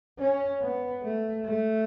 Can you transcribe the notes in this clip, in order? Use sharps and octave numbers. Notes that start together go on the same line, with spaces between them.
C#4
B3
A3
A3